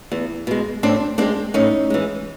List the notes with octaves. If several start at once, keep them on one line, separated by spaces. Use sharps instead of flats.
E2
B2 G#3
A2 C4 D4
E3 G#3 C4 D4
A2 C#4 D#4
E3 G#3